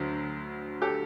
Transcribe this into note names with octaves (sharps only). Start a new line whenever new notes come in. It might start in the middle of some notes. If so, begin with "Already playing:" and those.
Already playing: D2 D3 F#3
G4 A4